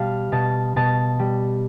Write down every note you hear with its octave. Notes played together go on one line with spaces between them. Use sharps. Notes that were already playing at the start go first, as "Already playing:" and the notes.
Already playing: B2 G3 F5 A5
B2 A5
B2 A5
G3